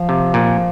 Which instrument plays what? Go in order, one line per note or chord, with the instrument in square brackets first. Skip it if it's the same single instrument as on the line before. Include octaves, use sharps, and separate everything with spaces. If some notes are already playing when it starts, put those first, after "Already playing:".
Already playing: [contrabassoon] F3
[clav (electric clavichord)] C3
A#2